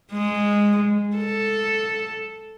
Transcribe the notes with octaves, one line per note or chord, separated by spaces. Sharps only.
G#3
A4